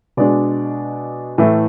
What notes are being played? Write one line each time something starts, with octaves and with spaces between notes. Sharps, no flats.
B2 G#3 D4 D5
A2 E3 A3